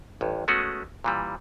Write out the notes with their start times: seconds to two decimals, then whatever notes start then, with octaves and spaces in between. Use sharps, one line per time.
0.21 A1 G2
0.48 G#3 A3 B3 C#4 F#4 G#4
1.04 A#2 E3 G3